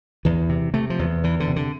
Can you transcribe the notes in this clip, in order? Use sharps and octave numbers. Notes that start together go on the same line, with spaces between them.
E2 E3
C3
C3 A3
F3
E2
E2 E3
D3
C3
D3